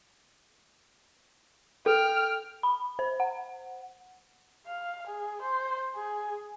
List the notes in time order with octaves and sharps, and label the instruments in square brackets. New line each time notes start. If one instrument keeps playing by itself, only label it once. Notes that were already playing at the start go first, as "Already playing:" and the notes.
[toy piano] A4 [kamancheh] G5 F6
[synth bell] B5
C5
F#5
[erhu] F5
G#4
C5
G#4